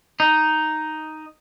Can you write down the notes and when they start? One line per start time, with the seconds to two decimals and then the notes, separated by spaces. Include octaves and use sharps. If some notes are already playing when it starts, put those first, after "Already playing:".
0.20 D#4